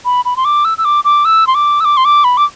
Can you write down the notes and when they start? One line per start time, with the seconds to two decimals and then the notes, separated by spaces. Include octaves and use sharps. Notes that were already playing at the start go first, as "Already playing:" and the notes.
0.05 B5
0.25 B5
0.37 C6
0.45 D6
0.65 E6
0.78 E6
0.85 D6
1.05 D6
1.25 E6
1.47 C6
1.55 D6
1.80 E6
1.85 D6
1.97 C6
2.05 D6
2.24 B5
2.37 D6